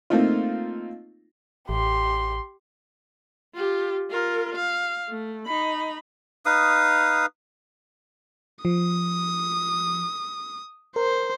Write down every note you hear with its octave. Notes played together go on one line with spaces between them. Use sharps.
A3 A#3 C4 D#4 F4
A1 G4 C6
F4 G4
F4 A#4
F5
A3
D#4 B5
D#4 B4 F5 D#6
F3 D#6
A#4 C5